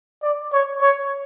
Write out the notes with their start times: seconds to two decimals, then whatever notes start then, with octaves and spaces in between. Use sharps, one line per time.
0.23 D5
0.53 C#5
0.82 C#5